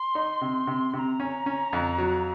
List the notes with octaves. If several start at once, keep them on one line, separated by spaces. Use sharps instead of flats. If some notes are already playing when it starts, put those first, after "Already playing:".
Already playing: C6
D#4
C3
C3
C3 A#5 C6
C#4
C#4
F2
F#3